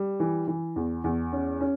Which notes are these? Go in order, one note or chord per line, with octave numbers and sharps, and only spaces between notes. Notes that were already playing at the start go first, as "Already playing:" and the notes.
Already playing: G3
E3
E3
E2
E2
C#4
C#4